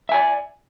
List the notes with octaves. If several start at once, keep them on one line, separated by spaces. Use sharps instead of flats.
D5 E5 G#5